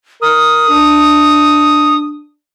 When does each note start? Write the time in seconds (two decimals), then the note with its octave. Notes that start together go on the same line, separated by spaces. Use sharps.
0.22 A#4 D#6
0.69 D4